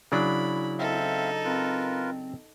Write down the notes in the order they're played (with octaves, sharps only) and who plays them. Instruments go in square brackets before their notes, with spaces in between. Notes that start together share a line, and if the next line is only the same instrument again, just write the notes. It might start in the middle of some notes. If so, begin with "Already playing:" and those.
[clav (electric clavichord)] C#3 F#3 D4 [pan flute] E4 [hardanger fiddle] B5
[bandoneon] C4 E5 F5 [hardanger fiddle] D#4 A4
[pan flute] C4 [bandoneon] F4 A#4 B4